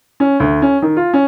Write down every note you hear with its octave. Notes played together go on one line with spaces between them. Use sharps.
C#4
D2
C#4
D#3
F4
C#4